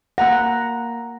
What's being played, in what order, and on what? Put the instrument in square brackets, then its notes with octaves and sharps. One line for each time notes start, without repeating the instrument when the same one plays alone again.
[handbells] A#3 A#5 A#6 [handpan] F#5